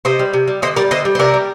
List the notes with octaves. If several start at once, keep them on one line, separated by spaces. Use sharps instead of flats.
C3 C5 D#5
G3
C3
G3
D3 C5 D#5
G3 A#4 D5
D3 C5 D#5
G3
C5
C3 A#4 D5
G3